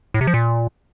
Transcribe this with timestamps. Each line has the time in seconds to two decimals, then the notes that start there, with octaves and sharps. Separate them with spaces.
0.14 A2
0.21 C3
0.27 F3
0.34 A#2